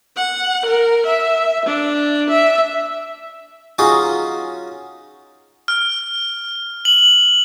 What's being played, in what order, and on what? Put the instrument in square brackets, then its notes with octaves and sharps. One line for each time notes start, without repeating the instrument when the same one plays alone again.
[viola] F#5
A#4
E5
D4
E5
[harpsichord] F#3 C#4 D#4 F4 F#4 G#4
[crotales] F6
F#7